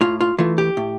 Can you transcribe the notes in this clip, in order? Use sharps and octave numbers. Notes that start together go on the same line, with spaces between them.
A2 F4
F4
E3 A3 F4
G4
A2